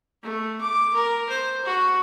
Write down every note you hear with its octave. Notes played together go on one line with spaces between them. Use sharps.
A3
D6
A#4
C5
F#4